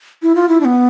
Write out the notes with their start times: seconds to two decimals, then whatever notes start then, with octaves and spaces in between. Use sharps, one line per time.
0.22 E4
0.35 F4
0.49 E4
0.61 D4
0.65 B3